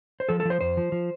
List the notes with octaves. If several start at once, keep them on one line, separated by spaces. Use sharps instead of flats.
C5
F3 A4
A4
F3 C5
F2 C5
F3
F3